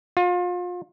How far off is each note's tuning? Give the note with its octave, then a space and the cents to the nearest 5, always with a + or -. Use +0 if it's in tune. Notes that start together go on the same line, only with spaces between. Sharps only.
F4 +35